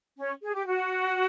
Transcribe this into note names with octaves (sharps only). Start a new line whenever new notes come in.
C#4
G#4
G4
F#4